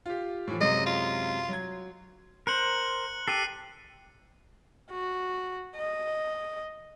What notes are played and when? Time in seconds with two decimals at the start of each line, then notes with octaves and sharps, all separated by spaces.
0.06 F4 G4
0.48 A2 E3 F3
0.60 F#2 C3 G#3 D#5
0.86 F4
1.49 F#3 G#6
2.47 A#4 C5 F#6 C#7 F#7
3.28 G4 A4 C7 D#7
4.91 F#4
5.76 D#5